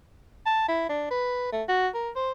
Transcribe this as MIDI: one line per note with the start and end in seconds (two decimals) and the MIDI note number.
0.46 0.66 81
0.68 0.88 64
0.89 1.10 62
1.11 1.51 71
1.52 1.63 57
1.69 1.88 66
1.95 2.10 70
2.16 2.32 72